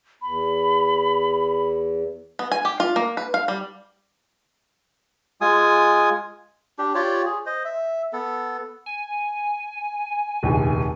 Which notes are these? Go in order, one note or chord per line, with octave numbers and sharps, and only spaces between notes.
E2 B5
B3
G#5
G4
F4
A#3
B4
F5
G3
G#3 F4 G#5 D#6
D4 G4
F4 G4 C#5 D5
G#4
C5 D#5
E5
B3 A4
G#5
F1 A#1 D#2